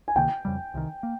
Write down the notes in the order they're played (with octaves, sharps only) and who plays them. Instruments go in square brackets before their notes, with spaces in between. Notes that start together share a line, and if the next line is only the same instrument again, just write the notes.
[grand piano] G#5
[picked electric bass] C#2 C3 D#3 A#3 [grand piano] G5
[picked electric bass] F2 C#3 G3
C2 C3 D#3
A#3